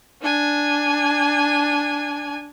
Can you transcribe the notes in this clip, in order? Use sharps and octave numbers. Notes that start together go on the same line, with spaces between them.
D4 G#5